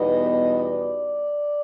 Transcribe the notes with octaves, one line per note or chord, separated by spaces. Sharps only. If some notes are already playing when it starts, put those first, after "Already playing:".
Already playing: E2 B2 G3 B3 D#4 D#5
D5